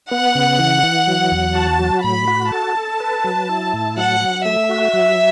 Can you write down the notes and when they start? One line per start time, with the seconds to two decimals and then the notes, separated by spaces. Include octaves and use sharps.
0.11 B3 F#5
0.35 C#3
0.59 E3
0.83 E3
1.07 F#3
1.31 E2
1.55 F#4 A5
1.79 F#3
2.04 A2 B5
2.28 F#4
2.52 A4 A5
2.77 A4
3.00 B4
3.24 F#3
3.49 E4
3.73 A2
3.97 F#3 F#5
4.21 F#3
4.45 A3 E5
4.69 F#4
4.93 F#3